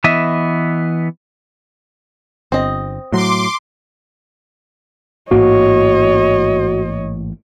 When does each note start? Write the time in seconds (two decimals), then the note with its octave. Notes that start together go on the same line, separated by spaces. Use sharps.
0.04 E3 B3 D#5 E5
2.52 G1 C4 D#5
3.12 A2 F#3 C6 D6
5.31 A1 G#2 A#3 F#4 C#5 D#5